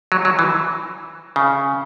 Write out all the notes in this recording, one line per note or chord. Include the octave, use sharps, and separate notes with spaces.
F#3
F#3
E3
C#3